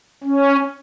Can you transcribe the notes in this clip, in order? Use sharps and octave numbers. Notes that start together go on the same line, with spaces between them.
C#4